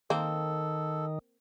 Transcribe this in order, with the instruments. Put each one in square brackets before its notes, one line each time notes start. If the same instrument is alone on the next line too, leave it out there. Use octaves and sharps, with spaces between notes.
[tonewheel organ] D#3 [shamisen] A#3 C4 [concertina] A4